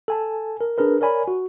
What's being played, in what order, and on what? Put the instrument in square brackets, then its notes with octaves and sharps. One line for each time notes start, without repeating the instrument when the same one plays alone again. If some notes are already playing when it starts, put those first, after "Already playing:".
[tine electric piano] A4 G#5 A5
A#4
D4 G#4 A#4 B4
A#4 C#5 D5 G#5 B5
F#4